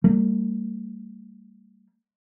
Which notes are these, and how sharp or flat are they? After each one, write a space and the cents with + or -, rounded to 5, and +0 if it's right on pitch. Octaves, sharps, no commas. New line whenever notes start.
G3 +0 A#3 -45